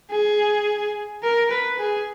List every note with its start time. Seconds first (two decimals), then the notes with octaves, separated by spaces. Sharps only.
0.11 G#4
1.23 A#4
1.51 B4
1.79 G#4